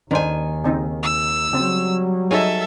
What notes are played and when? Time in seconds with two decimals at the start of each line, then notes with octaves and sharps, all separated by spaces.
0.11 D#2 D#3 C#4 D4 C5 G#5
0.64 C#3 C4 D#4
1.03 E6
1.53 C#3 F#3 G3 C4
2.31 D#4 G#4 A4 C#5 D#5 E5 G#5